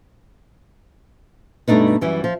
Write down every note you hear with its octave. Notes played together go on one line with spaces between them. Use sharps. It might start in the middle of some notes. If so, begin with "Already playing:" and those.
G2 B2 A3 D4 D#4 B4
F#2 E3 G3 E4
F3